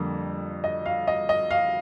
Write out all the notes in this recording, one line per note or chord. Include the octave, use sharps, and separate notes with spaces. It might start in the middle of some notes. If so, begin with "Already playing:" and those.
Already playing: F2 D3 G3 A#3
D#5
F5
D#5
D#5
F5